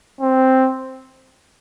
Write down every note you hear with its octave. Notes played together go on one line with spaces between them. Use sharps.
C4